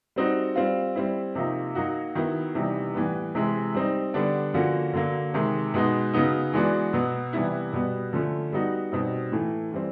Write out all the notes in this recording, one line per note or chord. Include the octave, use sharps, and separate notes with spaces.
G3 C4 D#4 F#4
G3 C4 F4
G3 C4 E4
C3 F3 A#3 D#4
F#3 A#3 D#4 F#4
D#3 F#3 B3 E4
C3 E3 G3 B3 D#4
A2 E3 G3 B3
C3 E3 G#3
G3 C4 D#4
D3 G3 B3 D4
D3 F3 A#3 C#4 F#4
D3 F#3 A#3
C3 D#3 G#3
B2 G#3 B3 D#4
C#3 F#3 B3 D#4
E3 G#3 B3 D4 F#4
B2 F#3 B3
C3 E3 G3 B3 E4
B2 G3 B3
D3 F3 A3 C#4
G3 B3 D#4 F#4
B2 G3 C4 D#4
A2 E3 A3
E3 G3 C4